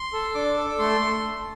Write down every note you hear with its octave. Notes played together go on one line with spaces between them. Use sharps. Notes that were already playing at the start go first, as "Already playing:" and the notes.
Already playing: C6
A4
D4 D6
A4
A3 C6